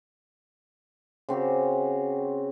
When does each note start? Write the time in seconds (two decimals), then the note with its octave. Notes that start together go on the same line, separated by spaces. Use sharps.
1.29 C#3 C4 F#4 G4